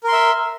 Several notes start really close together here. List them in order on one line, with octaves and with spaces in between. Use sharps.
A#4 C6 E5